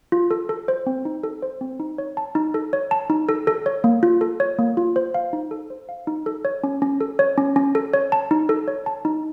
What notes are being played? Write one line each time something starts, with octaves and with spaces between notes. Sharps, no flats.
F4
A4
A4
C5
C4
D#4
A4
C5
C4
D#4
C#5
A5
D#4
A4
C#5
A5
D#4
A4
A4
C#5
A#3
F4
A4
C#5
A#3
F4
C5
F5
D#4
A4
C5
F5
D#4
A4
C#5
C#4
C#4
A4
C#5
C#4
C#4
A4
C#5
A5
D#4
A4
C#5
A5
D#4